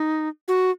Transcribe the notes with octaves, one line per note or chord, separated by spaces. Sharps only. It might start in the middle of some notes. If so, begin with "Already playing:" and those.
Already playing: D#4
F#4